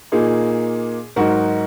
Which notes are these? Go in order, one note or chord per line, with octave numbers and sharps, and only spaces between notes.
A#2 A#3 D#4 G#4
G#2 F#3 D#4 F#4 A#4